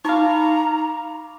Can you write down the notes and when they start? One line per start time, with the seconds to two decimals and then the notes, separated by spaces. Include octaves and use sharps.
0.05 D#4 F5 A#5 B5 C#6 D6